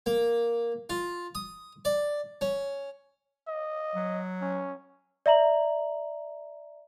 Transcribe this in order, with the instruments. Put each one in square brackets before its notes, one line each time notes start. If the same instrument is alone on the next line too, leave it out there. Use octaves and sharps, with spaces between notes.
[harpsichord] A#3
F4
D#6
D5
C#4
[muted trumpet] D#5
[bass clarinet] F#3
[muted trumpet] C#4
[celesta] D5 E5 A#5 F#7